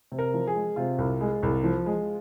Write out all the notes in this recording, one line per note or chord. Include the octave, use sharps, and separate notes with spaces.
C3
A#4
F3
G#4
G#3
C3 F4
C2
G#3
C2
F3
G#3